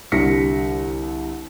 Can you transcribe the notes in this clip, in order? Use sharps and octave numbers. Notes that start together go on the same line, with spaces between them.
C2 D3 G3 A#6 B6 C#7